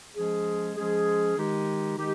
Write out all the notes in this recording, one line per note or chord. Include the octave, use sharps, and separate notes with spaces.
F3 G#3 C#4 G#4
F3 G#3 C#4 G#4
D#3 G#3 D#4 G4
D#3 G#3 D#4 G4